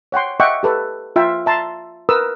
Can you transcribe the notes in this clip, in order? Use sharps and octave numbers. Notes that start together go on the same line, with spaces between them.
C#5 F#5 G5 C6
D#5 E5 F#5 G5 C#6 D6
G4 A4 B4
F4 E5 G5
E5 A5 A#5 C6
A#4 B4 D#6 E6